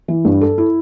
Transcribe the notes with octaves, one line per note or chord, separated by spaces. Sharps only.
E3
G2
A4
E4